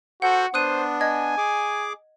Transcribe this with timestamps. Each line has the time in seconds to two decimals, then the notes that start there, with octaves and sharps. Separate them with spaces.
0.22 F#4 A4 C5 F#5 G6
0.54 B3 D4 C5 D#6 F#6 D#7
1.01 D#5 G#5 G#6
1.37 G#4 D6